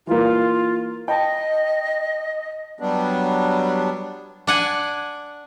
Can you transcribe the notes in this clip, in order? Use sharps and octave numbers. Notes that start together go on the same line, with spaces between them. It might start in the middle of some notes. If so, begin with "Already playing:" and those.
E3 A#3 F4
D#5 G5 A5
F#3 G3 B3 D4
D4 F#5 G#5